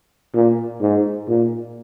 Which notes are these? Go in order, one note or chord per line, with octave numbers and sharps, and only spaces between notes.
A#2
G#2
A#2